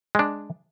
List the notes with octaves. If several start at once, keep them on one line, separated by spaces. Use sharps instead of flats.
G#3 D4